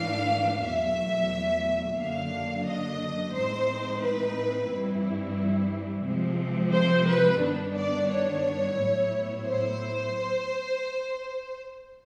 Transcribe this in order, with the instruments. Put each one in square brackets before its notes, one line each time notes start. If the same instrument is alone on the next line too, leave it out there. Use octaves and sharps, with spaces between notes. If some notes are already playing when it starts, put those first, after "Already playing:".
Already playing: [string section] G#2 E3 A3 D4 F5
E2 B2 F#3 A3 E5
F#2 D3 F#3 A#3 D4 F5
D#5
A2 E3 G#3 C4 D#4 C5
B4
G2 E3 G3 C4 E4
C3 F3 G#3 C4
C5
B4
G2 D#3 G3 B3 D4
D5
C#5
A2 F#3 B3 E4
C5